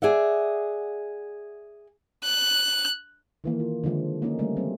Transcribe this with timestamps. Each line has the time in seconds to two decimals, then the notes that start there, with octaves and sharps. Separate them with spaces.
0.02 G#4 D5 E5 F#5
2.24 F#6
3.44 D#3 E3 A#3
3.59 F4
3.84 D3 D#3 F3 G#3
4.22 A#3 C#4 D#4
4.39 C#3 G3 A3
4.57 F#3 C4